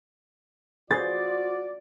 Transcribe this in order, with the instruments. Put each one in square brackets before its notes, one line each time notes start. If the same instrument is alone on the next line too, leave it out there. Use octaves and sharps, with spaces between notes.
[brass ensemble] F4 F#4 D5 [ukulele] G#4 C5 [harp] A6